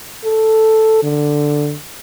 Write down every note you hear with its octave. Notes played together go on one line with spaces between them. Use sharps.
A4
D3